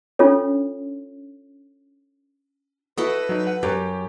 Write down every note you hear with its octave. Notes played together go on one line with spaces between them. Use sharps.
C#4 D4 F4 A4 C#5
E4 F#4 A4 B4 D#5
F#3 D#4
F#5
F#2 G4